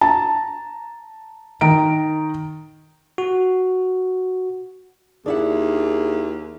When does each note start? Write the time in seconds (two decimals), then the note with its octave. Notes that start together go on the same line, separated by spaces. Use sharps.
0.01 A5 A#5
1.61 D#3 A#5 D7
3.18 F#4
5.26 D#2 D4 E4 G#4 F#5